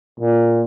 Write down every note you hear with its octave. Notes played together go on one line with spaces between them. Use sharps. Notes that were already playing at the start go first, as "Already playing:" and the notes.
A#2